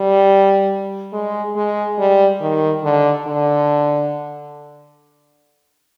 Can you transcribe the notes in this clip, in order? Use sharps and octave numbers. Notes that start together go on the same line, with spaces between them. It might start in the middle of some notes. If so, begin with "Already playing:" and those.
Already playing: G3
G#3
G#3
G3
D#3
D3
D3